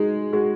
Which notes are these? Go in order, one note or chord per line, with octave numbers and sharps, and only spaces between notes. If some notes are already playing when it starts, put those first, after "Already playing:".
Already playing: G#3 D#4 F#4
G#3 F#4